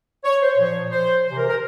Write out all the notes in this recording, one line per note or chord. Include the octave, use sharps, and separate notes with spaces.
C#5
C5
A#2 F3 C#5
C5
C3 E3 C5
A#4
A#4